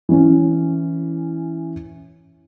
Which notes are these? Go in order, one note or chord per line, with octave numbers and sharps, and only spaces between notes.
E3 C#4